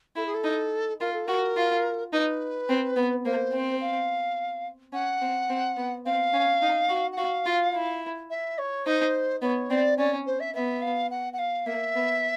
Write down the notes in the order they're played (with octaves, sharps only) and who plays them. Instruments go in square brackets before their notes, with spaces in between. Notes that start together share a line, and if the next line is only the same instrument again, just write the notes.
[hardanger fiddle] E4 [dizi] A4
[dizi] G#4
A4
[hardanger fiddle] D#4
[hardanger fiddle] F4 [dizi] A#4
[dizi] A4
[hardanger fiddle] F#4 [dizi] A#4
[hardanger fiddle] F4
[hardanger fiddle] D#4 [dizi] B4
[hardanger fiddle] C4
B3
[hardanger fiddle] A#3 [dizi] C5
[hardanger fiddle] C4
[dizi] F5
[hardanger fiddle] C#4 [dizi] F#5
[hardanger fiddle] C4
C4
B3
[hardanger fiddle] C4 [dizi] F5
[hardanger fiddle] C#4
D#4
F#4
[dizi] F#5
[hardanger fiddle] F#4 [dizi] F5
[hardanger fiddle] F4
E4
[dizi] E5
C#5
[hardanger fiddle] D#4 [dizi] C5
[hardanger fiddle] B3 [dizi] C#5
[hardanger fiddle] C4 [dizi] D5
[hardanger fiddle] C#4 [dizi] D5
[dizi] C5
E5
[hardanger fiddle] B3 [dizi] E5
[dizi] F5
F#5
F#5
F5
[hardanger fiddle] A#3 [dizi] E5
[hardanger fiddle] B3